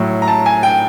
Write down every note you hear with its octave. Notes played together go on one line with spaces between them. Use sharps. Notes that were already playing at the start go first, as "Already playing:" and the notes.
Already playing: A2 F#3
A#5
A5
G#5
G5